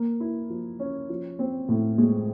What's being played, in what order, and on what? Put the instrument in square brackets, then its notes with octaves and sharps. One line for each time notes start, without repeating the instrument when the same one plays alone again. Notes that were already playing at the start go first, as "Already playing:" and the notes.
Already playing: [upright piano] A#3
E4
F3
C#4
F3
C4
A2
G#3